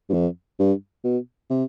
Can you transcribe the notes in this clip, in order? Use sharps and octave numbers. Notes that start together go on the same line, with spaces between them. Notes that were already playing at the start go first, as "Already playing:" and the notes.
G2
F2
G2
B2
C3